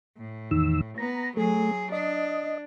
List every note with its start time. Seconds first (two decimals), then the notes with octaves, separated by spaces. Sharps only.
0.17 A2
0.51 E2 D#3 E6
0.98 B3 A#5
1.37 F#3 A3 G#4
1.92 D4 D#5